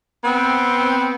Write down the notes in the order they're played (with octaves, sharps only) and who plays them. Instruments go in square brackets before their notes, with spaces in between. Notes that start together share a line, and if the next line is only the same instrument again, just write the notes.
[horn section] B3 C4